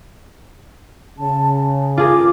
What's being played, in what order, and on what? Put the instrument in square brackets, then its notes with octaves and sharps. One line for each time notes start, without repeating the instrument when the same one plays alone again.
[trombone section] C#3 [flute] A5
[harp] F4 G#4 A#4 [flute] D6